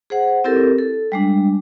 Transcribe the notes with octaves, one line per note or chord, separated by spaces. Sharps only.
G#4 C5 F#5
C4 E4 G4 A4 A#4
A4
G3 G#3 D4